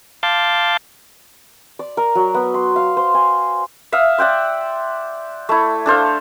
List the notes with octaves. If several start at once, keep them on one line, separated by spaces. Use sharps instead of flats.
F5 A5 C6 D6 G6
D5
A#4
F#3
B3
C6
F5
C5
G#5
E5 F5 D#6
D5 F#5 G5 C6
A3 E4
D4 A4 C5 F5